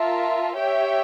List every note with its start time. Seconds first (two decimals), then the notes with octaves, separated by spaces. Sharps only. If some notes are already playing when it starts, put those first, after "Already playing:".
Already playing: F4 A#4 E5 A5
0.55 G4 C#5 E5 G5